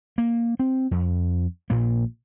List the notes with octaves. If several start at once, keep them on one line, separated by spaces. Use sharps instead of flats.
A#3
C4
F2
A#1 A#2 A#3